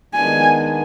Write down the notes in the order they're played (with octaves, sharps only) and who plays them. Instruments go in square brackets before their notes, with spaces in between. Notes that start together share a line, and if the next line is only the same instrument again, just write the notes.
[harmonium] D#3 G#3 B3 D4 [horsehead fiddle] G#5